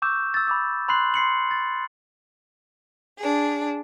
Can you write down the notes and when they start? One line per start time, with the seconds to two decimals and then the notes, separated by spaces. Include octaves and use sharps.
0.02 C#6 D6 E6 G6 E7
0.34 E6 A6
0.47 B5 D6 E6
0.89 B5 C6 F#6 C7 F#7
1.14 C6 C7 C#7 F#7
1.51 A6
3.18 D4 G#4